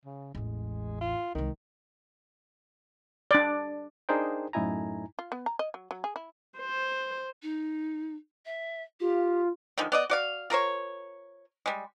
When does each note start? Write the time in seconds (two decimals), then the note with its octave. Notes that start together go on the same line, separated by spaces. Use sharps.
0.05 C#3
0.35 A1 E2 G#3
1.01 F4
1.35 C2 D#3 G#3
3.31 D4 D5
4.09 D4 D#4 G#4 A#4 C5 G5
4.53 F#2 A2 D#4 E4 G#5 A#5
5.19 F4
5.32 B3
5.46 A#5
5.59 D#5
5.74 F#3
5.91 F#3
6.04 G#4
6.16 E4
6.59 C5
7.43 D#4
8.46 E5
9.00 F4 G4
9.78 D3 D#3 F3 G#3
9.92 B3 D5 D#5
10.10 F#4 D5 F5
10.50 F4 A#4 C5 C#5
11.66 G3 G#3